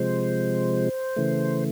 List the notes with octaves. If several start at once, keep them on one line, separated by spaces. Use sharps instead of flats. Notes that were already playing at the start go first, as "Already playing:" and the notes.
Already playing: C3 F3 G#3 C5
C#3 E3 A3